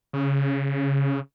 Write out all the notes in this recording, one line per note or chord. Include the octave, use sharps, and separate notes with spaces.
C#3